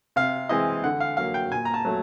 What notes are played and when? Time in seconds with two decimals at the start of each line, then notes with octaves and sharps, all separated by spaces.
0.16 C3 F5
0.49 E3 G#3 C4 E4 D#5
0.84 D3 F#5
1.00 F5
1.17 F#3 A#3 F5
1.34 G5
1.51 A#2 G#5
1.65 A#5
1.74 A5
1.85 F#3 A3